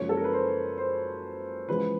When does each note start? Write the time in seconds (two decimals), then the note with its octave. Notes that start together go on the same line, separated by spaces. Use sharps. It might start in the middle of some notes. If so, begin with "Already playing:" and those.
Already playing: F#1 F#2 C#3 F3 G#3 C#5
0.09 A4
0.17 A#4
0.24 B4
0.33 C5
0.77 C5
1.68 E2 C#3 F3 G#3 B4